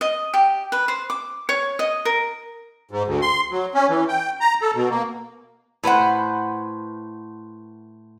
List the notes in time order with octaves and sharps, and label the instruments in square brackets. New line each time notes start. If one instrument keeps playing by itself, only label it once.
[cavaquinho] D#5
G4
B4
C5
D6
C#5
D#5
A#4
[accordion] G#2
D2
C6
F#3
C#4
E3
G5
A#5
A4
B2
A#3
[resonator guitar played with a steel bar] A2 B4 C5 F#5